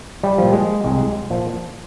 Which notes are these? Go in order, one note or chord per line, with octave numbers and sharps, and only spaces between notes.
G3
A#2 F3
G#3
C2 G#3
A#2 F3